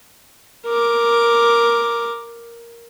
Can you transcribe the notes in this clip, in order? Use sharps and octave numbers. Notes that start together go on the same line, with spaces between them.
A#4 D6